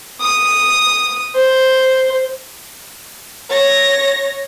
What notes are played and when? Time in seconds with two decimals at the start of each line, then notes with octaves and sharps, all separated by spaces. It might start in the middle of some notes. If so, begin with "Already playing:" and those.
0.21 D#6
1.35 C5
3.50 C#5 A#6